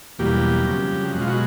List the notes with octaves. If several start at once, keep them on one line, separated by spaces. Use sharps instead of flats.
E2 B2 F#3 G3 A#3 G4
F2 C#3 F#3
B2 G#3 F4 F#4
F#3 F#4